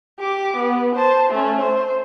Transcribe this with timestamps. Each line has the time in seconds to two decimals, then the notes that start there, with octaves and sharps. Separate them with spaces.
0.19 G4 D6
0.57 B3
0.96 C5 A5
1.31 A3 C#4
1.62 C5